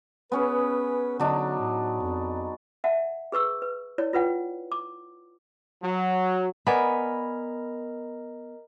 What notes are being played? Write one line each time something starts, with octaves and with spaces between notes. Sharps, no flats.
B3 C#4 G#4 B4
D3 F#3 D4 D#4
A2
F2
E5 F#5 A5
G#4 B4 C#6 E6
B4
E4 C#5 D5
F4 B4 F#5 G5
D6
F#3
B3 A#4 D5 D#5 G#5 A#5 B5